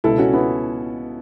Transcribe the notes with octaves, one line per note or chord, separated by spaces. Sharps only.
C#2 B2 E4 A4
C#4 F#4
B3 E4